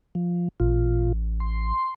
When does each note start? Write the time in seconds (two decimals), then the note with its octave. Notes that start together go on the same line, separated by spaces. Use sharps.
0.15 F3
0.60 A1 A#2 F4
1.40 C6